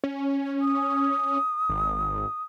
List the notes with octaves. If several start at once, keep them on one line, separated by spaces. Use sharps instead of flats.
C#4
D#6
G#1